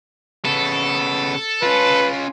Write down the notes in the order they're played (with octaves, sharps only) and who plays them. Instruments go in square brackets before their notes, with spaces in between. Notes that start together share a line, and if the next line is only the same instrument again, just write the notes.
[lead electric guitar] C#3 B3 [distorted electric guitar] A4
[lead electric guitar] C#4 F4 [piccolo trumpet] B4